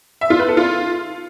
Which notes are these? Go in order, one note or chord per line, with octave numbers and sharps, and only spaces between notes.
E5
F4
B4
A4
F4